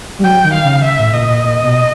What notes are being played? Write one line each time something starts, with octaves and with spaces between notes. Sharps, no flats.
G3
F#3 G5
D#3
F5
C#3
E5
A2
A#2 D#5
A#2
A#2
B2